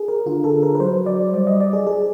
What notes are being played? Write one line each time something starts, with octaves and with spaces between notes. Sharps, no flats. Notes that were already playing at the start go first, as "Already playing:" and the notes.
Already playing: G#4
A#4
D3 F4
A4
A#4
B4
F#3 C5
D5
G3 D5
D#5
D5
G#4
G#4